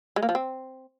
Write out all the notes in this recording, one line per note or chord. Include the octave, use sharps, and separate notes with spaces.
G#3
A#3
F3
C4